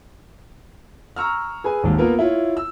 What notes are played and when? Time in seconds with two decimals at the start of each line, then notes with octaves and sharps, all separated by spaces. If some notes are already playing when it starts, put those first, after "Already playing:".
1.16 A#5 C#6 E6 F6
1.64 G#4 B4 G#5
1.83 G#1 D#2
1.98 A#3 B3 F4 A#4
2.19 E4 F4 C#5
2.57 E6